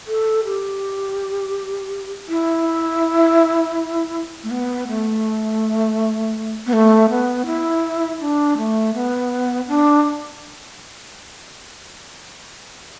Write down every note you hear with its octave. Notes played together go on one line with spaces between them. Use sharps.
A4
G4
E4
A3
B3
A3
B3
A3
B3
E4
D4
A3
B3
D4